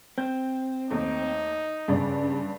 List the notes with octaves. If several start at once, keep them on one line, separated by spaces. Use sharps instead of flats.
C4 G6
D#2 A3 D#4
F#1 G2 C#3 D5